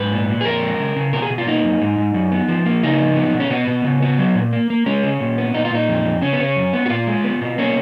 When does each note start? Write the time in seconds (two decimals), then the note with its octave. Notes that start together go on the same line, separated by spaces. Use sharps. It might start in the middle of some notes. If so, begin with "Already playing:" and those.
Already playing: G#2 B4
0.11 A#2
0.29 A#2
0.41 G#4
0.45 F2 A#4
0.62 G#3
0.80 C#3
0.96 C#3
1.13 B2 A#4
1.22 G#4
1.30 B2
1.38 F4
1.47 A#3 D#4
1.64 F#2
1.81 G#2
1.98 G#2
2.14 F#2
2.32 B3
2.48 F3
2.66 A#3
2.83 C#3 D#4
3.00 F3
3.16 B3
3.34 B2
3.40 C#4
3.50 B2 B3
3.67 B2
3.84 C#3
4.02 B3
4.18 F#3
4.35 A#2
4.53 A#3
4.70 A#3
4.86 G#3 C#4
5.03 C#3
5.20 A#2
5.38 B3
5.54 A#2 D#4
5.65 F4
5.71 A#2 D#4
5.89 F2
6.05 F2
6.22 C#3 C#4
6.33 B3
6.39 C#3 C#4
6.56 F#2
6.73 B3
6.86 F#4
6.90 A#2 F4
7.07 G#3
7.24 B3
7.41 B2
7.58 A#3 C#4